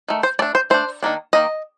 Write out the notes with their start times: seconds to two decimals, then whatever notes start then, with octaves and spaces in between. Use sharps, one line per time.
0.08 D#3 A3
0.23 C5
0.39 A3 D5
0.42 D4
0.55 C5
0.70 A3 D4 C5
1.03 D#3 A#3 D4
1.33 D#3 A#3 D#5